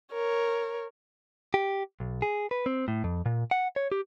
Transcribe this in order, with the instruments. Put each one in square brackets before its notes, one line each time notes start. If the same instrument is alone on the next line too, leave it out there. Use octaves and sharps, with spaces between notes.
[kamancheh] A#4 C#5
[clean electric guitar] G4
B1
G#4
B4
C4
A2
F2
A#2
F#5
C#5
G4